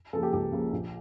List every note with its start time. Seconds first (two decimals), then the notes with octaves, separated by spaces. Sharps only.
0.13 C#3 F3 A#3 A4
0.23 G4
0.33 C#2 G4
0.52 C#3 F3 A#3
0.72 A#1